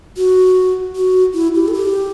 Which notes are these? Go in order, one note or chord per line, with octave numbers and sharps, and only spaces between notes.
F#4
F#4
E4
G4
A4
G4